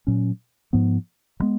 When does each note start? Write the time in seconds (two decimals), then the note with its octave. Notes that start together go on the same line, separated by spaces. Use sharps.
0.07 A#2 F#3 C#4
0.73 G#2 F3 B3
1.40 D#3 G#3 B3